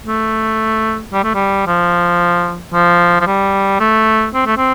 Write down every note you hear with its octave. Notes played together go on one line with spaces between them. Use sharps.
A3
G3
A3
G3
F3
F3
F3
G3
A3
C4
A3
C4